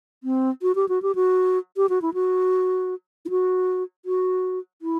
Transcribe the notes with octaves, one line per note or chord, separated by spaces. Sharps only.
C4
F#4
G4
F#4
G4
F#4
G4
F#4
E4
F#4
E4
F#4
F#4
E4